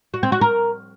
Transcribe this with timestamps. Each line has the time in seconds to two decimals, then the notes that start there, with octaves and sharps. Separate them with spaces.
0.14 F#4
0.23 C4
0.32 F#4
0.41 A#4